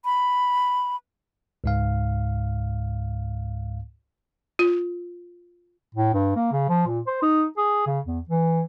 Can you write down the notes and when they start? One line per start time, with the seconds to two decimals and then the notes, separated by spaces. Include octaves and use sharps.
0.05 B5
1.64 C#2 G#2 F5
4.59 F4
5.95 A2
6.14 G2
6.36 A#3
6.52 C#3
6.69 F3
6.87 A#2
7.07 C5
7.22 D#4
7.57 G#4
7.86 C#3
8.06 E2
8.29 E3